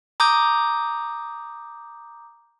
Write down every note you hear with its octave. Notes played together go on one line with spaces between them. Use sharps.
A#5 D6 D#6 G6